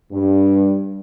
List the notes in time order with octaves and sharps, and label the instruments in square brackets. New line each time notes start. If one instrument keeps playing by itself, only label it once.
[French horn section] G2